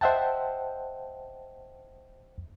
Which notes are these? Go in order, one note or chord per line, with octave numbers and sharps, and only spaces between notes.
C5 D#5 E5 F#5 G5 A5